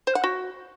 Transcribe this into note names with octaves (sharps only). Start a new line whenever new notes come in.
C5
F#5
F#4